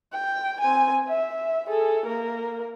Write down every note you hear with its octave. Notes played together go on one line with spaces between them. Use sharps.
G5
C4 G#5
E5
G#4 A4
A#3 A#4